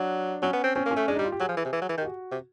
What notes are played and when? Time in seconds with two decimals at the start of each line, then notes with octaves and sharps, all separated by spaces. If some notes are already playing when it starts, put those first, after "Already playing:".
Already playing: F#3 D4
0.42 F#3 C#4
0.53 B3
0.64 C4
0.75 C4 C#4
0.86 A#3
0.91 C#4
0.96 A3
1.08 G#3 D4
1.15 G3 D#4
1.24 F4
1.32 G4
1.40 F#3 G#4
1.49 F3
1.57 E3
1.65 C3
1.73 E3
1.82 F#3
1.89 E3
1.98 D#3
2.01 G4
2.05 F#4
2.32 C3